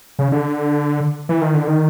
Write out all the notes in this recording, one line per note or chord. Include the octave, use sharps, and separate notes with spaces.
C#3
D3
E3
D#3
D3
D#3